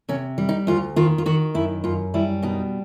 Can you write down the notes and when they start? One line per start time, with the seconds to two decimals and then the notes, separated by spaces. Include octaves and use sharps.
0.09 C3 C#4
0.38 G3
0.49 D#4
0.67 D2 F4
0.96 D#3 F4
1.18 F4
1.26 D#3 F#4
1.54 F#2 E4
1.84 F#2 F4
2.14 G3 E4
2.42 B2 D#4